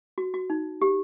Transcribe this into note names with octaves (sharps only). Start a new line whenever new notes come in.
F#4
F#4
D#4
G4